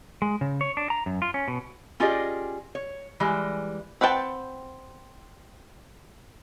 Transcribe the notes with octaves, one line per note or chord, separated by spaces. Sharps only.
G#3
C#3
C#5
D4
A#5
F#2
F4
C#4
B2
C#4 F4 G4 G#4 D5 D#5
C#5
E3 G3 G#3
C4 B4 F#5 G5 A5